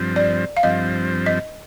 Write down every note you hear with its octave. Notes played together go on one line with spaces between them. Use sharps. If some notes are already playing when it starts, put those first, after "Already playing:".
Already playing: G2 F3 C4
D5
F5
G2 F3 C4 D#5
D#5